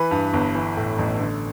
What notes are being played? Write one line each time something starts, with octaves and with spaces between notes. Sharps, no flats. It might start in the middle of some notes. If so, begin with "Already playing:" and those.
Already playing: E3 B4
G2
G1
E3
A2
A1
D3